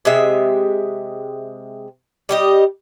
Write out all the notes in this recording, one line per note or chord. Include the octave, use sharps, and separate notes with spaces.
C3 G#3 E5
G3 G4 D#5